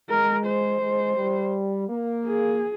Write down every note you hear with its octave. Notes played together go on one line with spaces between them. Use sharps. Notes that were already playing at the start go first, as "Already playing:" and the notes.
G#3 A#4
C5
G#3
G3
A#3
G#4